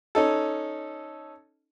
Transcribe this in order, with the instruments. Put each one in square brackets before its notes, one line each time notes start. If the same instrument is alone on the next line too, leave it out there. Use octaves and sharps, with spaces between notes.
[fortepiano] C#4 D#4 A4